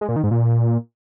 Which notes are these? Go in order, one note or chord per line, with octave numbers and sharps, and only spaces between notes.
G#3
A#2
D#3
G#2
A#2